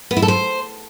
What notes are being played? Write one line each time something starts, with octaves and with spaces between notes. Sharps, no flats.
B3
E4
A4
C5